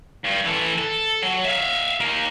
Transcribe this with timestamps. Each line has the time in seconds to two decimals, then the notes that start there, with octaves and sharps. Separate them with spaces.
0.24 G2
0.45 E3 A4
0.78 A4
1.23 F#3
1.45 E5 F5
2.01 A#3 D#4